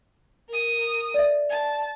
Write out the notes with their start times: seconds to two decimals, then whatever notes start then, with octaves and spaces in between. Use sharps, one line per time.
0.49 A#4 D#6
1.14 D5 E5
1.49 A5